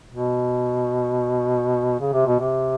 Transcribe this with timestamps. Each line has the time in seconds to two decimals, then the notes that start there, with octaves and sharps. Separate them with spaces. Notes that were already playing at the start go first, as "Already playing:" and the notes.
0.12 B2
2.00 C#3
2.13 C3
2.27 B2
2.39 C3